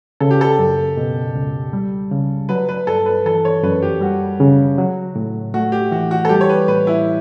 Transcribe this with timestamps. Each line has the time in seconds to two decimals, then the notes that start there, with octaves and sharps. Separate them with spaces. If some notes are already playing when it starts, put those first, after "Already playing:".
0.20 C#3 A4
0.31 G4
0.41 A4
0.59 F#2
0.97 B2
1.35 C#2
1.73 G3
2.11 C#3
2.49 F#3 B4
2.69 B4
2.87 G2 A4
3.06 B4
3.25 E3 A4
3.45 C#5
3.63 F#2 B4
3.82 G4
4.01 G3 F#4
4.40 C#3
4.78 F#3
5.16 A2
5.54 A3 F#4
5.72 G4
5.91 E3 F#4
6.11 F#4
6.25 A4
6.29 G3 G4
6.41 C#5
6.49 B4
6.68 A2 B4
6.87 E4